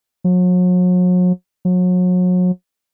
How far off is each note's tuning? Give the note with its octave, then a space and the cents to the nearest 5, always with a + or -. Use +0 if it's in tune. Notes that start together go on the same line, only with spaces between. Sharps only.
F#3 -40
F#3 -35